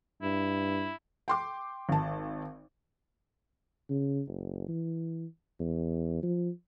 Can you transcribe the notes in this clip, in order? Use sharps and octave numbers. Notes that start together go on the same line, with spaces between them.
G2 E4
G5 C6 D6
G#1 A5
C#3
F#1
E3
E2
F3